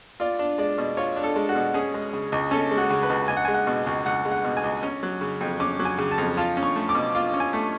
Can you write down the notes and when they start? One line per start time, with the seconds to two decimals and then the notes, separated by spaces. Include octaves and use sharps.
0.20 F4 D5
0.39 D4
0.58 G#3 D5
0.78 B2
0.97 F4 C#5
1.16 D4
1.23 A4
1.36 G#3
1.49 F#4
1.55 B2
1.74 C#4 G#4
1.94 G#3
2.13 C#3
2.32 C#2
2.51 C#4 A4
2.71 G#3
2.78 F#4
2.90 C#3
3.03 B4
3.10 C#2
3.28 C#2 G#5
3.37 F#5
3.45 G#3 G#5
3.54 F#5
3.67 B2
3.87 C#2
4.06 C#2 F#5
4.25 G#3
4.31 F#5
4.44 B2
4.57 G#5
4.64 C#2
4.83 C#4
5.03 F#3
5.21 C#3
5.41 F2
5.60 C#4 D6
5.79 F#3
5.85 G#5
5.98 C#3
6.11 A5
6.18 F2
6.37 F4 A5
6.57 C#4
6.63 C#6
6.76 A3
6.89 D6
6.94 B2
7.15 F4 D6
7.34 C#4
7.40 G#5
7.53 A3